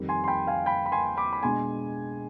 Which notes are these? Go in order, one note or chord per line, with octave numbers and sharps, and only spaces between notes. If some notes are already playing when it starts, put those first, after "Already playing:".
Already playing: F2 D#3 G3
G#5 C6
C6
G5 B5
F5 G#5
G5 B5
B5
G#5 C6
B5 D6
B5
B2 G#3 D4 G#5 C6